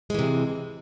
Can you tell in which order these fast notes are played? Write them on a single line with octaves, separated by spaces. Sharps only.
G#3 E3 C3